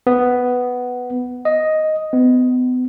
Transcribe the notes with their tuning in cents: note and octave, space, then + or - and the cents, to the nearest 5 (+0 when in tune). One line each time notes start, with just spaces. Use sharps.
B3 +5
D#5 +5
B3 +35